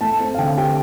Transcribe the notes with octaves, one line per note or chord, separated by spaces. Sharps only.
A3 A5
C4
F5
D3 G5
G4 G5